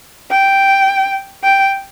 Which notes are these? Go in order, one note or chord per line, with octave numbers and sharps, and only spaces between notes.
G5
G5